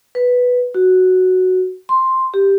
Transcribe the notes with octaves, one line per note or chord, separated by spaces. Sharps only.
B4
F#4
C6
G4